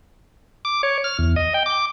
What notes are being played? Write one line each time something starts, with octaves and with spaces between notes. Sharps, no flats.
D6
C#5
F6
E2
D#5
G5
D6